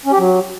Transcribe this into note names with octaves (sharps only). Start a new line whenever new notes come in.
C#4
G4
F#3